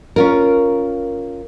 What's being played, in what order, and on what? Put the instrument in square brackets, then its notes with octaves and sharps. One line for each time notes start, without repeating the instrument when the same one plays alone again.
[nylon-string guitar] C#4 F4 A#4